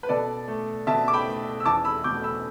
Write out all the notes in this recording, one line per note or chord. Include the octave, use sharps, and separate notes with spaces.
B4
B2 A4 D5
A3
B2 E5 A5
D6
G5 B5
A3
E6
E2 A5 D6
B5 E6
B2 A3 D6 G6
B5 E6